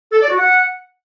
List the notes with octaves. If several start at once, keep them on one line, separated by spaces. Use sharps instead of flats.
A4
D5
F#4
F#5